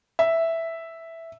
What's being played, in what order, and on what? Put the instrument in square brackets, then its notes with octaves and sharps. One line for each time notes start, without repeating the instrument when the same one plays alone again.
[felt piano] E5